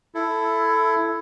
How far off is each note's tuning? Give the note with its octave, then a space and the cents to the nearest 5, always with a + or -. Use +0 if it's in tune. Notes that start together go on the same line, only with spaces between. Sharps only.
E4 +15 A4 +0